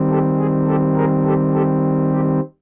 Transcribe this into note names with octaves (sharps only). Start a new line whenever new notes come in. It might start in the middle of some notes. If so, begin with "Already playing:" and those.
Already playing: D#3 G3 C4
G4 A4
G#4
G4 A4
G#4 A#4
G4 A4
G4 A4
G4